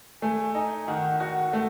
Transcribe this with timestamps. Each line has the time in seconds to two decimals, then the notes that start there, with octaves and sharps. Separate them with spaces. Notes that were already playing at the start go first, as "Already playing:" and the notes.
0.22 A3 G#5
0.55 D#4 G#5
0.88 D#3 F#5
1.20 F#4 F#5
1.53 A3 F#5